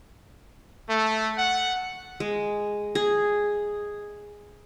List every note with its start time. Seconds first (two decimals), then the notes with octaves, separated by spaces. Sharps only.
0.89 A3
1.38 F#5
2.20 G#3
2.95 G#4